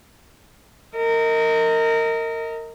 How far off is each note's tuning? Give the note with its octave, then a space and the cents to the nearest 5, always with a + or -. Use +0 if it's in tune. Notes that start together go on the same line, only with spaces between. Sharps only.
A#4 -25 D#5 +25